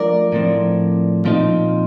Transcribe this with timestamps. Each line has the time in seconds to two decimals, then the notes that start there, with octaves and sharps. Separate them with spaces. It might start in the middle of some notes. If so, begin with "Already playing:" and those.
Already playing: F3 A3 D4 F4 A#4 D5
0.32 A2 F3 C4
1.25 A#2 F3 C4 D#4